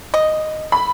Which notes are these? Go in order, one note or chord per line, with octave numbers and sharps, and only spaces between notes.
D#5
B5